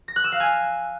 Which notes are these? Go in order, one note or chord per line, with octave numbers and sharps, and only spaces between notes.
A#6
F#6
E6
F5
G#5